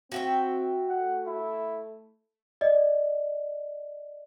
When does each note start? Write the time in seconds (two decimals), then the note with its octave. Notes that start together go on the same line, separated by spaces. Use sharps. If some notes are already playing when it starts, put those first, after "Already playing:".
0.12 C4 F#4 E5 G5
0.89 A3 F#5
1.27 E4
2.61 D5 D#5